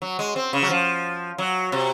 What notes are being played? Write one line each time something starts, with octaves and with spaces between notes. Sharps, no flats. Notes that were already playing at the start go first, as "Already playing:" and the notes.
F#3
G#3
C4
C#3
F#3
F3
F#3
C3